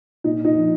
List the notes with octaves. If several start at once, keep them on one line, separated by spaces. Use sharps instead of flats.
A#2 D#4
D#4
F3